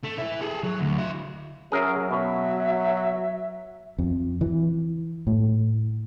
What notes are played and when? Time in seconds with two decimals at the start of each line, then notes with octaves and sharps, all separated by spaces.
0.03 A3
0.18 E3 E4
0.42 G#4 A4
0.63 F#3
0.80 D2
0.98 E4 F#4
1.72 F#3 C#4 G#4 A#4 E5
2.11 B2 E5
3.98 F2
4.41 E3
5.27 A2